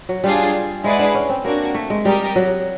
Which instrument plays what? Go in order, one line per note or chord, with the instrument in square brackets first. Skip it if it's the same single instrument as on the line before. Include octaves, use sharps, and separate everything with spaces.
[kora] F#3
[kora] G3 [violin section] D4 F4 G#4
[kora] G#3 [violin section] E4 G#4 B4 D5 F#5
[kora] D4
C#4
C4
[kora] A#3 [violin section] D4 F#4 A#4
[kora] A3
G#3
[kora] G3 [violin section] G4 A#4 D#5
[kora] F#3